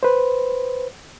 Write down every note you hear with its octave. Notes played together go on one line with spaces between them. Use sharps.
B4 C5